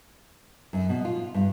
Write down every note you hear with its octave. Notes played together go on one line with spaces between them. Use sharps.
F#2
B2
F4
G2